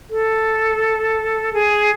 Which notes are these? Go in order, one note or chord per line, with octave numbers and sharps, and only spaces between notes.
A4
G#4